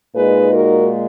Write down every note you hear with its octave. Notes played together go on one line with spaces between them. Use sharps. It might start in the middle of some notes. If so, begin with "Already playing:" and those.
A#2 G#3 D#4 G#4 B4
F#4 A#4